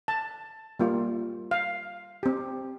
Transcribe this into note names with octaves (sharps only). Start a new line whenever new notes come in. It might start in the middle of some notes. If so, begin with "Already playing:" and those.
A5
G3 A#3 F4
F5
C4 G4